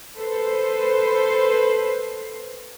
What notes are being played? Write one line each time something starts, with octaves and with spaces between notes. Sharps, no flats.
A4 B4 C5